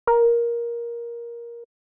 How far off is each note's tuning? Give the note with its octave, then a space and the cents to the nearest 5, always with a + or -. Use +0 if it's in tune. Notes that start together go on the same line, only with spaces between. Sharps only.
A#4 +15